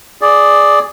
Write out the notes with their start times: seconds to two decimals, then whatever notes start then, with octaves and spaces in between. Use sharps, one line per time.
0.21 G#4 D5